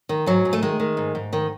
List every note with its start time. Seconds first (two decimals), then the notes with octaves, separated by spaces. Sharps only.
0.09 D#3
0.26 G#2 F#3
0.45 G#2
0.53 A3
0.62 D#3 G#3
0.80 D#3
0.97 G#2
1.15 G#2
1.33 D#3